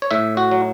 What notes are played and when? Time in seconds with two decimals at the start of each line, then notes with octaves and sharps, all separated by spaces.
0.02 C#5
0.11 A2 E5
0.37 F#4
0.51 F#3